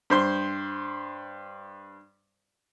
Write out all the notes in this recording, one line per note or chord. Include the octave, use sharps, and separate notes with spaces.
G2 C5 C6